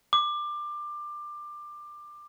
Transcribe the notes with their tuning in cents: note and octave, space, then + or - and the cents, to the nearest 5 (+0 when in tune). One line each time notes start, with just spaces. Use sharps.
D6 +20